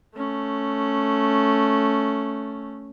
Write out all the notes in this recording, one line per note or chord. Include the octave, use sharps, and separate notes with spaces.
A3 C#4